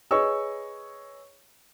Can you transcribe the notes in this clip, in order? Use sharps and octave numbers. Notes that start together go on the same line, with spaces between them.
G#4 B4 C#5 D#5 C#6 E6